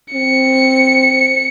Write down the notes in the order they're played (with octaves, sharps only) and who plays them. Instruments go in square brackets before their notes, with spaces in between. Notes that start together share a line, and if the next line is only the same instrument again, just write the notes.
[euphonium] C4 [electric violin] C#7